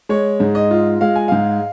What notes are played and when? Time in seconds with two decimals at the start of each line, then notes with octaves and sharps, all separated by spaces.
0.09 G#3 C#5
0.40 G#2
0.55 D#5
0.71 F4
1.01 G#3 F5
1.15 G#5
1.28 G#2 F5